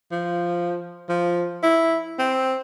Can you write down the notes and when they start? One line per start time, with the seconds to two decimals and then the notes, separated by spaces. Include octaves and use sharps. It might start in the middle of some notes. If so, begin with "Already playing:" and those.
0.11 F3
1.09 F3
1.63 E4
2.19 C4